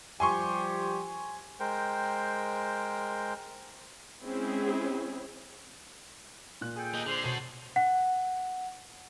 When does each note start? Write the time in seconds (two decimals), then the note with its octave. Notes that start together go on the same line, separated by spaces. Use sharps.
0.20 F3 G3 G4 G#5 C6 C#6
1.60 G#3 A#4 C5 G5
4.23 G#3 C4 C#4 E4 G#4
6.61 A#2 F#6
6.76 G#4 A4 G5
6.94 A#3 D#5
7.06 D3 G#3 G#4 C5
7.24 B2 A4 C#5 D#7
7.76 F#5